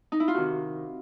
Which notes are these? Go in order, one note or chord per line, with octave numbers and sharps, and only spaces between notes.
D#4
E4
F4
C3 D#3 F#4